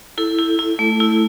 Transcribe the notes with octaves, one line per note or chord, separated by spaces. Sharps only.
E4 A4
E4
E4
A3
E4